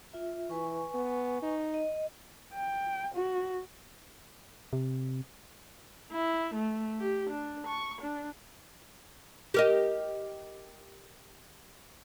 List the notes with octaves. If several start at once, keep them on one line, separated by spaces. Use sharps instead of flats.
F4 E5
E3 B4 G#5 C#6
B3
D#4
D#5
G5
F#4
C3
E4
A3
G4
D4
C#6
D4
G4 A#4 D#5